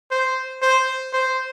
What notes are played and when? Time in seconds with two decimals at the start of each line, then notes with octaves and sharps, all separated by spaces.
0.11 C5
0.62 C5
1.13 C5